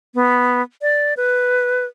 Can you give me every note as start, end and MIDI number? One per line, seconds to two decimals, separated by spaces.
0.15 0.62 59
0.82 1.14 74
1.17 1.85 71